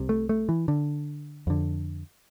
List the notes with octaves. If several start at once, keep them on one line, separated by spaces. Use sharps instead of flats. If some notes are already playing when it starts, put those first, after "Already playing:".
Already playing: C2 C3
A3
A3
E3
D3
F2 D3